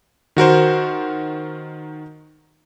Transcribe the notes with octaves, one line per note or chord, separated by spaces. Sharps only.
D#3 F#4 A#4 C5